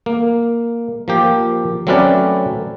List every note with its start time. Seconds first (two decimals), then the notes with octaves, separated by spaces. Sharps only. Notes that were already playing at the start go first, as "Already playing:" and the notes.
0.06 A#3
1.08 F3 A#3 G4
1.87 F#3 A3 C4 C#4 B4 D5